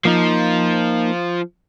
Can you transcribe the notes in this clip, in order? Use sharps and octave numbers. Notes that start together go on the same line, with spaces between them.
F3 A#3 D#4